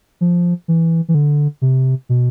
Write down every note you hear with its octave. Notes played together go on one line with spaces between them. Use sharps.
F3
E3
E3
D3
C3
B2